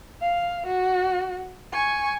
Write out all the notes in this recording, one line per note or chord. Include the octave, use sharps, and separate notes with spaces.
F5
F#4
G#5 C#6